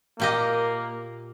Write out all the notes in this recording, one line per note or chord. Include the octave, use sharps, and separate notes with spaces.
A#2 A#3 G4 D#5